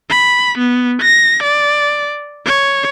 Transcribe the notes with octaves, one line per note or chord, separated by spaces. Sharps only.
B5
B3
A#6
D5
C#5